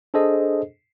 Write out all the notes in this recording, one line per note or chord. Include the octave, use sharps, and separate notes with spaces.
D4 G#4 A4 C5 D#5